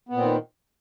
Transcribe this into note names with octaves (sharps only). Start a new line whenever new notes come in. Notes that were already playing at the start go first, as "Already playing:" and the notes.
A#2 D#3 B3 C4